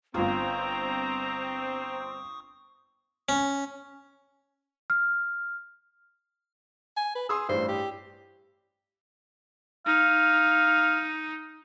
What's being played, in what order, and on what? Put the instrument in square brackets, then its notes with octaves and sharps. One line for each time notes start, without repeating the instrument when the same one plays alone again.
[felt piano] G1 F4 [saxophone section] C4 [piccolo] A#5 [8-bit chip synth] C#6 D#6
[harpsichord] C#4
[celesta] F6
[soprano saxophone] G#5
B4
[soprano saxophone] G#4 [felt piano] C6 D#6 E6
[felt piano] A1 G2 [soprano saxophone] C5
[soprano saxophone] G4
[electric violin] D#4 [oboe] F5